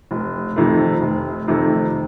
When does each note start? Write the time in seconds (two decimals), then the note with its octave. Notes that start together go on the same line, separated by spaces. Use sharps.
0.11 F1
0.56 F2 C3 D#3 A3
1.02 F1
1.48 F2 C3 D#3 A3